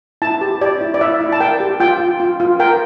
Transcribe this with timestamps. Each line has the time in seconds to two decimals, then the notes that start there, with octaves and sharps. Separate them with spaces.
0.22 E4 A5
0.41 G4
0.61 G4 D5
0.81 E4
0.94 D5
1.01 E4 E5
1.21 E4
1.32 A5
1.40 A#4 G5
1.60 G4
1.80 F4 G5
2.00 F4
2.20 F4
2.40 F4
2.60 A#4 G5